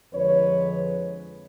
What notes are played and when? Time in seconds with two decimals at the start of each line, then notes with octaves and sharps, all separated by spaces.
0.13 F2 D3 F3 G#3 B4 C#5